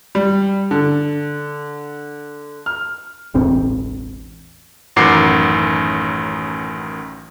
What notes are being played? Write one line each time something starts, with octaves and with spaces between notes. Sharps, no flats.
G3
D3
F6
E1 A1 C4
A1 F#2 D#3 F#5 D6 C7